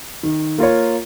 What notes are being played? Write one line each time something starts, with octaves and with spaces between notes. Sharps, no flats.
D#3
A#3 F4 A#4 C#5